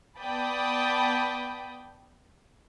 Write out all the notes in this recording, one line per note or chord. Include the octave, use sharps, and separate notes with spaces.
B3 D5 G5 A5 B5 D#6